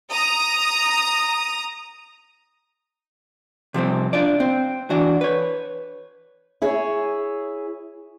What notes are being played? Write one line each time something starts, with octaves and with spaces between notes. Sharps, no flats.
A#5 D#6
C3 F3 G3 C4
D4 F4 D5
C4
E3 D4 F#4
B4 C#5
E4 G#4 C#5